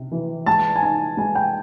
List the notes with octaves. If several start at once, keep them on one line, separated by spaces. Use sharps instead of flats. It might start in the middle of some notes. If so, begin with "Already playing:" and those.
Already playing: C3
E3
G#3 A5
G#5
D#4 A5
G#3 G#5
G5